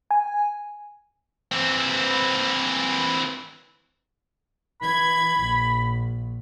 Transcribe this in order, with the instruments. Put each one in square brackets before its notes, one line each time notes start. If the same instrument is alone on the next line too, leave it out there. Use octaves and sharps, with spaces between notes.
[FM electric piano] G#5
[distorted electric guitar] E3 C4
[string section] E3 G#6 [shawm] B5
[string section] A#1